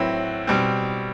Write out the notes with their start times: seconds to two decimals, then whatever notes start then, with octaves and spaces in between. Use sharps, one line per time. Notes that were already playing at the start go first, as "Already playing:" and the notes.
Already playing: A2 F#3 C4 E4 B4
0.47 B2 G3 C4